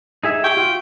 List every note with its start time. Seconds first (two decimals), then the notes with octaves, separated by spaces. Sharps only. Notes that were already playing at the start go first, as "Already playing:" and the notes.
0.24 D#4 G#4 E5
0.44 G4 G5 C#6
0.57 F4 F#4